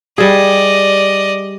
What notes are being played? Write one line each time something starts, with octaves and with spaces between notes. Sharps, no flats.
G3 G#4 D5 D#5